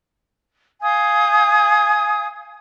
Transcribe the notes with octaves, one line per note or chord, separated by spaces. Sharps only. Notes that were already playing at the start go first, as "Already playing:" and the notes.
F5 G#5 D#6 G6